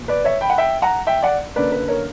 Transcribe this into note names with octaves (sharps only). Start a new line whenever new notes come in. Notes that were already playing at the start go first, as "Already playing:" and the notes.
Already playing: E2 B2 A#3
B4 D5
C#5 E5
G5 B5
F#5
E5 G5
F#5 A#5
E5 G5
D5 F#5
F#2 D3 A#3 B4 D5
B4
A#4 C#5